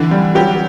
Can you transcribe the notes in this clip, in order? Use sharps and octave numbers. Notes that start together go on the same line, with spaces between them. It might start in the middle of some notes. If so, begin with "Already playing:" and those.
Already playing: D3 E3
G3
F#3 G4